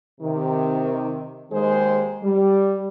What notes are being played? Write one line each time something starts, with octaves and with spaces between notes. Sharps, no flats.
C3 D#3
D#2 D#3 G#3 G#4 C5
G3